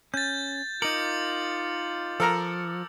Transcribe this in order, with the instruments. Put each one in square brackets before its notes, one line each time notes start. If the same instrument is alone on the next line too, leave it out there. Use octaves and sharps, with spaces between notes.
[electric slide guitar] C#4 [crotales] G6 A6
[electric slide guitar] D#4 A#4 [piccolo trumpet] F4 [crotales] D6 C#7 F#7
[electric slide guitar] F3 [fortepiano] A4 A#4 A#5